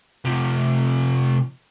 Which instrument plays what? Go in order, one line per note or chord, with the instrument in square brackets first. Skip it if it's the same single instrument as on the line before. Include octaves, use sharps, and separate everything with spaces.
[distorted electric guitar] C3 F3